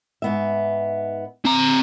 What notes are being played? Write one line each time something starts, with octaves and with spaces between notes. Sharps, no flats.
G#2 B3 E5
C4 A#5